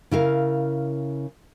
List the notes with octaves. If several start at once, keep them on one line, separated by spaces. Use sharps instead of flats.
C#3 E4 A#4 F5